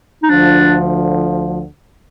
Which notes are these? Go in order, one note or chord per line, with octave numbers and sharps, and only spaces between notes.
D#4
D2 D3 F3 D4